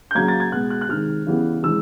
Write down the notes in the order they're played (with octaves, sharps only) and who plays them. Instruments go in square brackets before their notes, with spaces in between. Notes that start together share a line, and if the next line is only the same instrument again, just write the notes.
[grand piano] G6
C#3 F#3 A#3 G#6
A6
G#6
B2 G#3 B3 F#6
F#6
F#6
C3 D#3 G#3 F6
C#3 E3 G3 B3
C3 E3 G#3 E6